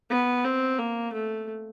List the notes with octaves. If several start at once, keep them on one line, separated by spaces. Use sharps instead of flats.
B3
C4
A#3
A3